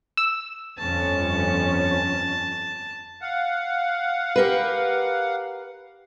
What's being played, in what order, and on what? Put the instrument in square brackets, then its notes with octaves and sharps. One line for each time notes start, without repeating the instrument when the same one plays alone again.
[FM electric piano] E6
[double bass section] G1 F2 C#4 [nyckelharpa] A5
[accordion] F5 F#5
[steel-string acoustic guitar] G4 A#4 B4